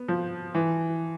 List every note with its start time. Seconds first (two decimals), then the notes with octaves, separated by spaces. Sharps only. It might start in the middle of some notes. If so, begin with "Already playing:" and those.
Already playing: B3
0.08 F3
0.55 E3